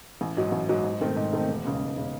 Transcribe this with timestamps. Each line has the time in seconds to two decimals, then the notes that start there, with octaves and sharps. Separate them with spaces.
0.21 A1
0.37 G#2 F#3
0.52 A1
0.69 G#2 F#3
0.84 G#2
1.01 D#3 A3 C4
1.16 G#2
1.33 D#3 A3 C4
1.49 E1
1.64 D#2 C#3 G#3
1.81 E1
1.96 C#3 G#3